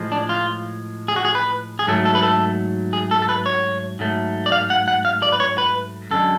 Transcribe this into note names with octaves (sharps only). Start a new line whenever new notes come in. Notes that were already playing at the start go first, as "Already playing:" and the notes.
Already playing: A2 F3 G#3
D4
F4
G#4
F#4
G#4
B4
G#4
G#2 F#3 A3 A4
A4
B4
A4
G#4
A4
A4
B4
C#5
G#2 F#3 A3
D5
F5
F#5
F#5
F5
D5
B4
C#5
B4
F#2 D3 G#3 A4